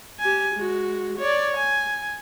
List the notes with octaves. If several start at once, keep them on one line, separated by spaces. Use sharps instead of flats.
G4 G#5
G#3 F#4
C#5 D5
G#5